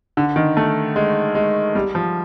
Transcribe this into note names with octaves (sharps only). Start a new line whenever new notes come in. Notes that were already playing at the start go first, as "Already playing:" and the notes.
D3
D#3
A3
G#3
G#3
G3
F3